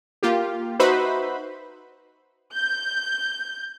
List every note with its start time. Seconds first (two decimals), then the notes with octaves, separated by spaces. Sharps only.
0.23 A#3 F4 G4
0.79 D#4 F#4 B4 C5 E5 B5
2.54 G6